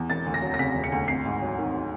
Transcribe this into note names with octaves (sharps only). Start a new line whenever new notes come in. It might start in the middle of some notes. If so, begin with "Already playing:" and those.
Already playing: E2
E1 A6
D2
A#6
F#3
A#6
C#3 B6
E1
C#7
D2
G#1 C7
G#2
F#3
D#3